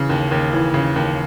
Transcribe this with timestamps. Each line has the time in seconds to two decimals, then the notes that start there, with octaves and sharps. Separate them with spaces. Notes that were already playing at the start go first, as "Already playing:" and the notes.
Already playing: C#3 E3
0.09 D#2
0.31 D#2
0.53 E3
0.74 C#3
0.96 D#2